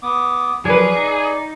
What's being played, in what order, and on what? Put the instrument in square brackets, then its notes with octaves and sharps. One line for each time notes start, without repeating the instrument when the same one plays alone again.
[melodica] B3 D6 D#6
[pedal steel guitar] F3 F#3 [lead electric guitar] G#4 [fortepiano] B4 G#5 [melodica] D5
[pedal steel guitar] D#4